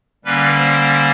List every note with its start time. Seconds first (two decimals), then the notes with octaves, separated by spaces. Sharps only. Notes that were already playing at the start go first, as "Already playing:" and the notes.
0.25 D3 G3 A#3 C#4 B4
0.56 C5